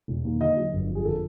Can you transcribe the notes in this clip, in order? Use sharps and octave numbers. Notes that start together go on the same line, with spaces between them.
E1
D#2
D3 D#5
F#3
G1
F2
G#4
D3 A4